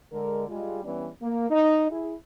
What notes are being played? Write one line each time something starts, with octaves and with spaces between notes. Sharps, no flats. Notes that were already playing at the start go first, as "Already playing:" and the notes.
D3 G#3 A#4
G3 G#3 F4
E3 G3 B3 C#4 D4
A#3
D#4
E4 G#4